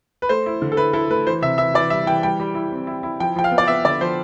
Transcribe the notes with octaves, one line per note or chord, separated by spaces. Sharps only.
B4
A3 C5
E4
D3
A4
E4 B4
E4 A4
A3 B4
E3 C5
C3 E5
E3 E5
E3 D5
G3 E5
E3 G5
G3 G5
G3
E4
C4
E4
E4
F3 G5
F3 G5
F5
B3
D5
B3 E5
D3 D5
F3 C5